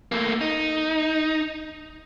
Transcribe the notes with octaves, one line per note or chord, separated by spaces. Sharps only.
A3 A#3
D#4